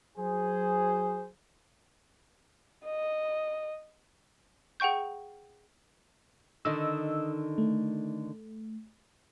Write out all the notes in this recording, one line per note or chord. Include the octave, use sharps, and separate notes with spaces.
F#3 G#4 C5
D#5
G#4 F#5 G5 C#6 G6
D3 D#3 D#4 D#5 E6
A3